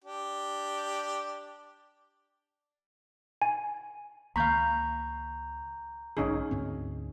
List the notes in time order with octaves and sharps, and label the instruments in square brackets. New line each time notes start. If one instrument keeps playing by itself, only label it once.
[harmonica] D4 G4
[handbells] G#5
[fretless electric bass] C#2 D#3 A#3 [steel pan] F5 B5 [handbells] A#5 C#6 G6
[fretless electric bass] B1 G#2 D3 [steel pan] C#4 D#4 G#4
[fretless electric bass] D2 G#2 C4